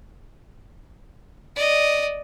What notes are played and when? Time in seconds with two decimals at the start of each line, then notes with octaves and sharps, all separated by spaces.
1.56 D5 D#5